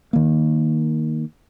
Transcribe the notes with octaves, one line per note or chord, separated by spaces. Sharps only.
D#3 A#3